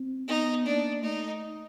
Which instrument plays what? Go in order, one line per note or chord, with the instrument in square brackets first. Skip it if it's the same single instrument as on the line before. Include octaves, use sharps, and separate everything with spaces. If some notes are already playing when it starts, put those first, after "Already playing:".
Already playing: [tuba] C4
[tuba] B3 [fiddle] D#4
[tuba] A#3 [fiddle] D4
[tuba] A3 [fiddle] D#4